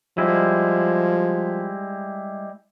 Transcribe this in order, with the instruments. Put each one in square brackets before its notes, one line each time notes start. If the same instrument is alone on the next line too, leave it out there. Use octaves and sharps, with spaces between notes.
[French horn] F3 [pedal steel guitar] G3 G#3 E4